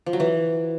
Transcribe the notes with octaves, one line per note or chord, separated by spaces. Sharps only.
F3
F#3
E3